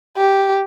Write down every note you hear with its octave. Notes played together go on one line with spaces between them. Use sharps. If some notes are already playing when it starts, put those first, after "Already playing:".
G4